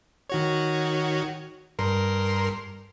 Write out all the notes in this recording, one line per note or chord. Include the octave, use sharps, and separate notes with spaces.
D#3 F#4 C#5
G2 A#4 C6